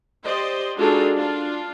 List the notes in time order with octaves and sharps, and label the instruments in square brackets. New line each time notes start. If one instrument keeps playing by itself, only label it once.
[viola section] G4 C5 D5 D#5
G#3 D4 D#4 F4 F#4 A4
D4 F4